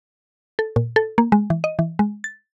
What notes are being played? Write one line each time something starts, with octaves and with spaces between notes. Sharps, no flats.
A4
A#2
A4
A#3
G#3
E3
D#5
E3
G#3
A6